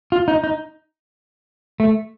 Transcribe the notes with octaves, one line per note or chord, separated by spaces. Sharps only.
F4
D#4
D#4
A3